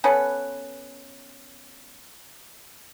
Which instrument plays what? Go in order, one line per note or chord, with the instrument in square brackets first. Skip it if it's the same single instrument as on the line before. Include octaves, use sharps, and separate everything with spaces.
[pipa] B3 C#4 A4 B4